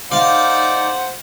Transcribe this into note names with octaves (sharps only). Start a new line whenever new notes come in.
D#4 C5 D5 F5 F#5